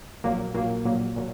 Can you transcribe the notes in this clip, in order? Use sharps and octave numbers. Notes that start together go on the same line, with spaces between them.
A#1 A#2 F#3 A#3
A#1 A#2 F#3 A#3
A#1 A#2 F#3 A#3
A#2 F#3